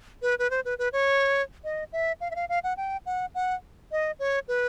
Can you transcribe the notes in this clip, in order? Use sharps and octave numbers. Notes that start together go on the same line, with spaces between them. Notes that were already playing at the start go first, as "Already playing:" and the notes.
B4
B4
C5
B4
B4
C#5
D#5
E5
F5
E5
F5
F5
F#5
G5
F#5
F#5
D#5
C#5
B4